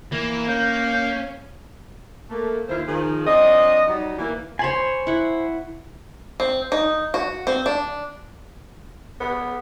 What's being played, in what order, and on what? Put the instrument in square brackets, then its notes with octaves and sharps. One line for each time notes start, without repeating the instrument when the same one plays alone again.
[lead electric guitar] E3 [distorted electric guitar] A#3
[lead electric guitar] C#4 [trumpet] F5 [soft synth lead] G6
[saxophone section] A3 A#3
D#2 E3 E4 F4 B4 C5
D#3 F3 G#4
F3 C4 D4 D#5
F#3 G3 D#4
E3 A#3
[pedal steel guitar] C5 G#5 [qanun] C#5 B5 C6
[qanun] E4 F#5
[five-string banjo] C4
D#4
F#4
C4
D4
[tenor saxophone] B3